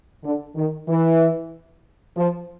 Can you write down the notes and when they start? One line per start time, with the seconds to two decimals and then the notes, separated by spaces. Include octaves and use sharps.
0.24 D3
0.56 D#3
0.88 E3
2.17 F3